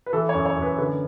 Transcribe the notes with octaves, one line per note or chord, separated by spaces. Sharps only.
B4
E3 A4
C#5
F#2
C#5
F#2
B4
D3 B4